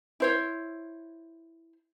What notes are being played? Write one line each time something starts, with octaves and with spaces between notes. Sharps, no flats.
E4 C5 C#5